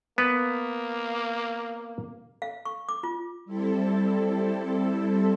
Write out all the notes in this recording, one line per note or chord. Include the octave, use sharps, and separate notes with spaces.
A#3 B3 B4
F5
C#6
D6
F4
G3 C4 E4 A4